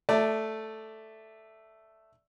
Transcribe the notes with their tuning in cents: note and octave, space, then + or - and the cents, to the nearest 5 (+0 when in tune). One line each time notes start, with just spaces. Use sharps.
A3 +0 D5 +0 A5 +30